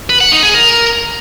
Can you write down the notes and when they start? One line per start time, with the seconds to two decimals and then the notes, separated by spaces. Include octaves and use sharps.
0.10 B4
0.21 F#5
0.32 D#4
0.43 G#4
0.54 A#4